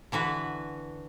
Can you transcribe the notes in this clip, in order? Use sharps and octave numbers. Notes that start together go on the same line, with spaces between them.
D3 E3 F#4 B4